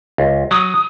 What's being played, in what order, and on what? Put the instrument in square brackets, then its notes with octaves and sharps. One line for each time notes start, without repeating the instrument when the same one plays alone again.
[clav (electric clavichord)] C#2
[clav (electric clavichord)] F#3 [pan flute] D#6